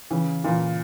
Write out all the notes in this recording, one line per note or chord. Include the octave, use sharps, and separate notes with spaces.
C#3 E3
A#2 E3